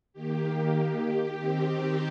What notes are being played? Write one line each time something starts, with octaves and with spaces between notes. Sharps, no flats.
D#3 A#3 G4
D#3 C4